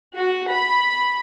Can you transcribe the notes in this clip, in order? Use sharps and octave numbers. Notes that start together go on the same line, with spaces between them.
F#4
B5